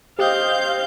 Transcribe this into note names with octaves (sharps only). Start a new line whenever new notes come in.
G4 C5 D#5 F5 G6